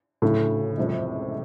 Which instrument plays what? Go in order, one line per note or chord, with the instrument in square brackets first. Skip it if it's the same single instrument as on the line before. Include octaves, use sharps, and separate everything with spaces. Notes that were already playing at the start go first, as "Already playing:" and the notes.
[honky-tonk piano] D2 C#3 F#3 [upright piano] A2
[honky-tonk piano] F#1 E2 C3 F3 G#3